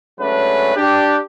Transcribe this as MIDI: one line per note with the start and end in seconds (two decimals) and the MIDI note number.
0.19 0.73 54
0.19 0.73 56
0.19 0.73 57
0.19 0.73 61
0.19 0.73 62
0.19 0.73 71
0.76 1.18 62
0.76 1.18 67